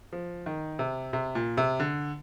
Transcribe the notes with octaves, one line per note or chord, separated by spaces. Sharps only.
F3
D#3
C3
C3
A#2
C3
D3